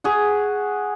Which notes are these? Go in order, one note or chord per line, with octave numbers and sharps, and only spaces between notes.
F#4 G#4